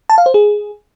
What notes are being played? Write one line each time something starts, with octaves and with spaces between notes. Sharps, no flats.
A5
F5
C5
G#4